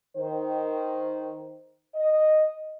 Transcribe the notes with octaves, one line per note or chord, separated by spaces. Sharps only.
D#3 C5
D#5